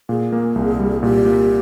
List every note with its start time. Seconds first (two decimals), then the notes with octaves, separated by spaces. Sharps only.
0.09 A#2 G#4
0.32 A#3
0.55 C2
0.79 G3
1.03 A#2 G4
1.26 A#3